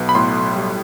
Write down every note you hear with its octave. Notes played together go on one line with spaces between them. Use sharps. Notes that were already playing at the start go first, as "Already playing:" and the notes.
Already playing: B1 B3
B5
A2 C6
G3